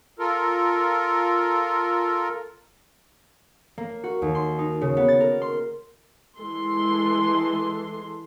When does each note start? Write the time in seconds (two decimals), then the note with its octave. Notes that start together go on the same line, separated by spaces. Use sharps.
0.19 F4 A4 A#4
3.78 A#3
4.04 F#4
4.22 D#2
4.35 C6
4.59 D#4
4.81 C#3
4.97 B3
5.08 A6
5.20 A#4
5.42 C6
6.37 E3 G#3 A4 C6